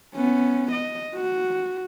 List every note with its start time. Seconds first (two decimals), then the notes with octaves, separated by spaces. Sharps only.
0.14 B3 C#4
0.72 D#5
1.15 F#4